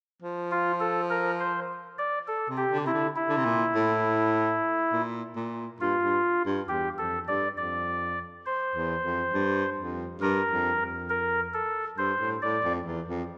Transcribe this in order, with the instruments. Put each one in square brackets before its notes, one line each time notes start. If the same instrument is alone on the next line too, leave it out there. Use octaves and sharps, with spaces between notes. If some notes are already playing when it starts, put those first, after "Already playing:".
[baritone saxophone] F3
[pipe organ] F4
A4
A#4
C5
D5
A4
[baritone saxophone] C3
[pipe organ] G4
[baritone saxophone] D3
[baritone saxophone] C3 [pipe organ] E4
[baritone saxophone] D3
[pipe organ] E4
[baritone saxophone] D3
C3
A#2
A2
A#2
A#2
[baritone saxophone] G2 [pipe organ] F4
[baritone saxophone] G2
G2
[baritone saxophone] E2 [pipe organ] G4
[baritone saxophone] F2 [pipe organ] A4
[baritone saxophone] G2 [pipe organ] D5
[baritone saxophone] F2 [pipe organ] D5
[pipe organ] C5
[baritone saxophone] E2
F2
G2
F2
[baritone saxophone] G2 [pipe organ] A#4
[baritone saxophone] F2
F2
[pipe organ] A#4
A4
[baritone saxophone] G2 [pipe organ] C5
[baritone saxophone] A2
[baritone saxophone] A2 [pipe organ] D5
[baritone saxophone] F2
E2
F2